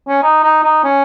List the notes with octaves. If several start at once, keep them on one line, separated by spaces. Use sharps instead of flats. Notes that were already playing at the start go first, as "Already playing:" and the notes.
C#4
D#4
D#4
D#4
C#4